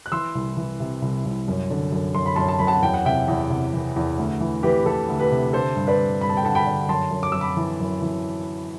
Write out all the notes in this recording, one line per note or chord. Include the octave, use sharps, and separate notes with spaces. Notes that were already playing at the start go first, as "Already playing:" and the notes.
F#6
E3 C6 E6
C2
E3
C3
C2
C2
F#2
D3
F#2
F#2 C6
B5
F#2 A5 C6
A5
F#2 B5
F#5 A5
E2 G5
F#5
C3 E5 G5
E2
C3
E3
E2
D2
E3
E3 G4 B4
E3 A4
D2
G4 B4
C3
D3 A4 C5
G2
B4 D5
G2
G2 B5
A5
G5
D3 F#5 A5
G5 B5
D3
F#2 A5 C6
F#2
D6
F#2 E6
B5 D6
E3
F#2
E3